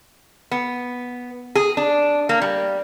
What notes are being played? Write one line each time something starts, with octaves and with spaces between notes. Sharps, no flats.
B3
G#4
D4
A#3
G3